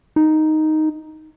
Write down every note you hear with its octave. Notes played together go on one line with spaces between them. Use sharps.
D#4